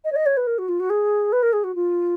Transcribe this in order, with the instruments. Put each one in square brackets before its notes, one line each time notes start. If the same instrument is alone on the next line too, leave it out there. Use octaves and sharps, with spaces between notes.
[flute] D#5
C#5
D#5
C#5
B4
A#4
F#4
F4
F#4
G#4
B4
A#4
G#4
F#4
F4